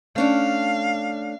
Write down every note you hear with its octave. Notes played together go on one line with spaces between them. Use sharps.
A3 C#4 D4 F5